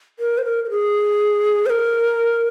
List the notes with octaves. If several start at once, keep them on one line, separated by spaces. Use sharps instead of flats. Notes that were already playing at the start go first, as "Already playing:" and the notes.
A#4
C5
A#4
A#4
G#4
C5
A#4